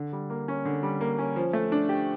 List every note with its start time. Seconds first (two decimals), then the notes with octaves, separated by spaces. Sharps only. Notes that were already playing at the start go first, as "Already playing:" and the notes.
Already playing: D3
0.13 G3
0.30 A#3
0.48 C#4
0.65 D3
0.83 G3
1.01 A#3
1.19 C#4
1.36 F3
1.53 A3
1.72 D4
1.89 G4